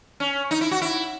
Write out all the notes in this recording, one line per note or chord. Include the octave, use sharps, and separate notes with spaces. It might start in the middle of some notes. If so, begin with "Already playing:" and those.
C#4
D#4
E4
F#4
E4